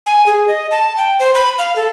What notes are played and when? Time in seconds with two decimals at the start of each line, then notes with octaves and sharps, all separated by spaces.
0.06 G#5
0.26 G#4
0.48 D#5
0.71 A5
0.97 G5
1.19 C5
1.35 B5
1.58 F5
1.76 A4